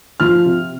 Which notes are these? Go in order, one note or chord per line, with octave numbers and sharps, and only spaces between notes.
F3 F6
C3